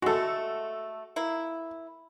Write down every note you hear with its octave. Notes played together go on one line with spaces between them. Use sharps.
G#3 A3 F#4 A4
A#3 E4